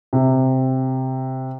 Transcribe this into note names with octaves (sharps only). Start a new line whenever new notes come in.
C3